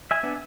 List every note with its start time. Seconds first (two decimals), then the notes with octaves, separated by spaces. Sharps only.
0.11 E5 G#5
0.23 B3 D4